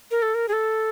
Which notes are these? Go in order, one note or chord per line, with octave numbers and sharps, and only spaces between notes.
A#4
A4
A#4
G#4
A4